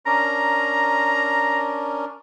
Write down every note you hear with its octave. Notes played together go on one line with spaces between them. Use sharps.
C#4 D4 A#4 A#5